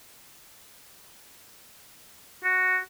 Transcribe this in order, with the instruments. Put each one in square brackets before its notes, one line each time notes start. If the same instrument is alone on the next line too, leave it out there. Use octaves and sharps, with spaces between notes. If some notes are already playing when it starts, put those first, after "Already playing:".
[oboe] F#4